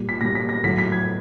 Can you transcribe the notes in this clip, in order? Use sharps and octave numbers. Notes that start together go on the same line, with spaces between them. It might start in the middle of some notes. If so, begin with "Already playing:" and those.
Already playing: A#2 G3
B6
A#2 G3 A#6
B6
A#6
A2 F#3 B6
B6
G#6